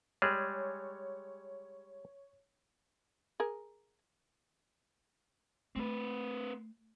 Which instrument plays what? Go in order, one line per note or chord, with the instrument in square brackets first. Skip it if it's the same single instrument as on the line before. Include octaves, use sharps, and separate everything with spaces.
[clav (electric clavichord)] G3 G#3 G#4 [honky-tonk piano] C#5
[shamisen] G#4 A#4
[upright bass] A3 [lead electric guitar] C4 B4